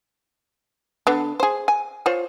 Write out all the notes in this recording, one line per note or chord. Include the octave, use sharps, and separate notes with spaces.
D3 B3
G#4 C5
G#5
F4 C5 C#5